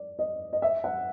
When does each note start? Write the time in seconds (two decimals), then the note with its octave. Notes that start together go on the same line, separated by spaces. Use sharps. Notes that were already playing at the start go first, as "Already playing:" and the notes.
Already playing: D5
0.19 D#5
0.53 D#5
0.62 E5
0.84 F#5